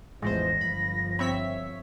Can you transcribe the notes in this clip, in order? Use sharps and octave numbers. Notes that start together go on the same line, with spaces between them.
A1 E2 A2 F3 G#3 C5 A#6
G1 F3 B5
C4 C#5 E5 B5 B6